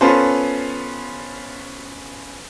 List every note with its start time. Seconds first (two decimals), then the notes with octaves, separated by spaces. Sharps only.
0.01 B3 C#4 F4 A4 B4 C5